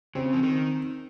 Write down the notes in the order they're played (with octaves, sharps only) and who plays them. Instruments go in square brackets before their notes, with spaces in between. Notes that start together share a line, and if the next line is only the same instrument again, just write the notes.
[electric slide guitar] C#3 [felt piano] C4
[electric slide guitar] F3
D#3